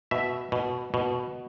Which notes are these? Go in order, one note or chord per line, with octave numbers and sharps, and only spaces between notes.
B2 E5
B2
B2